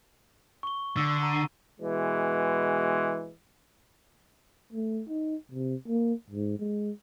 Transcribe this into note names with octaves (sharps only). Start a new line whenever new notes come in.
C#6 G7
D3 E6
A#5 D#7
B2 E3 G#3
A3
D#4
C3
A#3
G#2
G#3